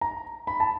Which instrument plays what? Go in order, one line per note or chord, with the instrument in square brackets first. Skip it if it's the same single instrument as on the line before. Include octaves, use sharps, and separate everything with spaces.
[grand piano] A#5
B5
A5